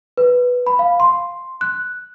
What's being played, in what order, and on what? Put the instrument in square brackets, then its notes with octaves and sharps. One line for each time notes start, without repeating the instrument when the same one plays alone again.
[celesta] B4
B5
F5
C6
F#6